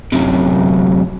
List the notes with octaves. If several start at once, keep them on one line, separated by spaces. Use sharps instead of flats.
F#2 C3